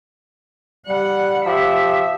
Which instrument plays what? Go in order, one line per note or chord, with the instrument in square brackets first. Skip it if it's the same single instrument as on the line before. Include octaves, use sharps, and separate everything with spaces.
[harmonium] G3 [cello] F#5
[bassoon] F3 [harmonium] G4 [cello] E5